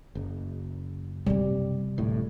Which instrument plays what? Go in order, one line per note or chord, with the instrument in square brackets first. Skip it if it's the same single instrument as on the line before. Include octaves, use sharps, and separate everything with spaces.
[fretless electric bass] F#1
[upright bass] C3 C4 [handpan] G3
[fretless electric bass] D1 A2